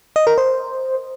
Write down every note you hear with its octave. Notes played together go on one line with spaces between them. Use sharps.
D#5
A#4
C5